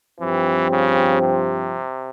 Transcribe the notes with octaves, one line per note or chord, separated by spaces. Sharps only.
G2 E3 F3 C4 G4
C#3
C3